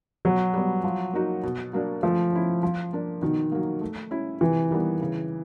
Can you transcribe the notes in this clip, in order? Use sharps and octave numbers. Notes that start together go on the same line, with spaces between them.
B2 F#3
G3 B3
F3
A#3 D#4 F#4
B2
F#3 A#3 D4
F3 A3
C#4 E4
F3
A#3 D4
B2 D#3
F#3 A#3
A3
C#4 E4
C3 E3
D#3 G3 B3
C#3